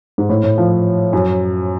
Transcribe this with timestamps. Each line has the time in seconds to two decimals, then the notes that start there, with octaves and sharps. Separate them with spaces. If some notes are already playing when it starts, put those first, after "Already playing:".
0.18 G#2
0.29 A2
0.44 A2
0.58 F3
1.13 F#2